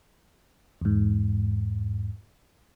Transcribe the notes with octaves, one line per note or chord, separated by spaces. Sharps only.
E2 G#2